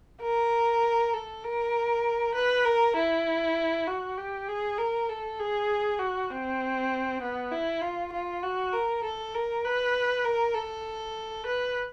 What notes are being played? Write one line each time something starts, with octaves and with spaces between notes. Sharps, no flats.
A#4
A4
A#4
B4
A#4
E4
F#4
G4
G#4
A#4
A4
G#4
F#4
C4
B3
E4
F4
F4
F#4
A#4
A4
A#4
B4
A#4
A4
B4